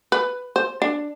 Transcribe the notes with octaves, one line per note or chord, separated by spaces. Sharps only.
B4
C5
D4